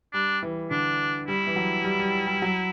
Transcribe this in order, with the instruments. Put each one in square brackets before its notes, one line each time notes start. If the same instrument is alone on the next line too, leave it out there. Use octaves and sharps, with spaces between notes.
[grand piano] G3 [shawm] D4
[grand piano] E3
[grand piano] D3 [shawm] D4
[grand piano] G3 [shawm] E4
[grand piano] E3
F#3
G3
G3
G3
F#3